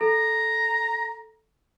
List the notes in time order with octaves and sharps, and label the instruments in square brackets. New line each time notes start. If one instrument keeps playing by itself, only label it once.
[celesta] A4 [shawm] A#5